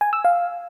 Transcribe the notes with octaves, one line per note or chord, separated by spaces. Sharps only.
G#5
E6
F5